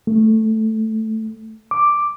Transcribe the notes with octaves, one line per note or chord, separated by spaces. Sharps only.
A3
D6